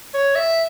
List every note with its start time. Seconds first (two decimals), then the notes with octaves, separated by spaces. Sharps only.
0.14 C#5
0.35 E5